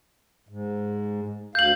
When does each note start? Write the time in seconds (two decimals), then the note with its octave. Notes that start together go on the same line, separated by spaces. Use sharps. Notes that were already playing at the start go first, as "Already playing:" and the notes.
0.49 G#2
1.55 D2 F5 G6 F#7